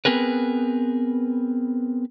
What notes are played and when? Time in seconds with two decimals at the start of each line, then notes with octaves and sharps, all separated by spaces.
0.05 B3 C4 G#4 A#4 B4